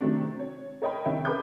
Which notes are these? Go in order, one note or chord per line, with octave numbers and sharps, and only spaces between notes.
C3 D#3 F#3 A3 C4 D4
C4
C#5
A#4 C#5 D#5 G5 B5
C2 D#3 E5 G5
A#4 B4 B5 D6 D#6 G6